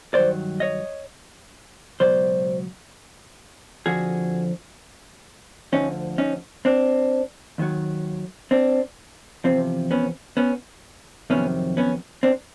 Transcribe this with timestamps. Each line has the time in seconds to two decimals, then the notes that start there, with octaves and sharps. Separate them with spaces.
0.14 G2 D#3 F#3 C5 D5
0.60 C#5 D#5
2.00 C#2 B2 F#3 C5 D5
3.86 F2 D3 F3 F#4 G#4
5.73 D2 D3 F3 C#4 D#4
6.18 C#4 D#4
6.65 C4 D4
7.58 D#2 D#3 F#3
8.51 C4 D4
9.44 E2 C3 F3 C4
9.91 B3 C#4
10.37 B3 C#4
11.30 F2 C3 D#3 F#3 B3 C#4
11.77 B3 C#4
12.23 C4 D4